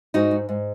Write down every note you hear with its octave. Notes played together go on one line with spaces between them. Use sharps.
G#2 D#4 F#4
G#3
G#2